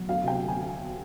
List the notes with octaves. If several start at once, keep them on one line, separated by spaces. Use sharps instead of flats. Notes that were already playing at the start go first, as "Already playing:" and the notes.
Already playing: F#3
D2 F5
C3 G5
D2
G#5